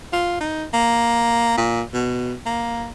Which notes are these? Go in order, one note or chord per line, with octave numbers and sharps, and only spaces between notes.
F4
D#4
A#3
A#2
B2
A#3